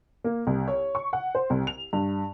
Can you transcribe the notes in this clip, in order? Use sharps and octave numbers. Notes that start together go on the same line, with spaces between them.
A#3
C2
C#5
C#6
F#5
C5
C2
F7
G2